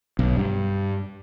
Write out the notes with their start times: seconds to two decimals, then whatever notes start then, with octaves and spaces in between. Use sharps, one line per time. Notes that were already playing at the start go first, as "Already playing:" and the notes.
0.19 B1
0.36 G2